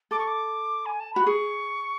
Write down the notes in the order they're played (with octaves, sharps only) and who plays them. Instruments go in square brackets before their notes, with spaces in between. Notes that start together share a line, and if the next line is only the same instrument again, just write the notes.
[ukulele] A4 [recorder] D6
[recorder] C#6
D6
G#5
A5
[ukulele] F#4 [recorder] B5
[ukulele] G#4 [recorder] C#6